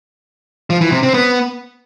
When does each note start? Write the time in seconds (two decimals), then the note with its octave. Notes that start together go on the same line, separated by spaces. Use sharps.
0.70 F3
0.81 E3
0.92 C3
1.03 C4
1.14 B3